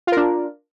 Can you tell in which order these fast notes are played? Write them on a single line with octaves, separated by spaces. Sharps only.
F4 A#4 D4